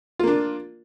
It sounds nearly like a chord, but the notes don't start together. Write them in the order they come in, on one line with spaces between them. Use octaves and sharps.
F4 A#3 D4